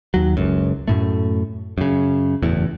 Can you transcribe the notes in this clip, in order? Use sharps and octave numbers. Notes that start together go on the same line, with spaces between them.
D#2 F#3
F#1 C#2 F#2
F#2 A2 A3
F#2 C#3
F#1 E2 A2